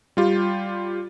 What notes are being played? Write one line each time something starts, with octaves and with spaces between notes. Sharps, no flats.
G3 F4 G4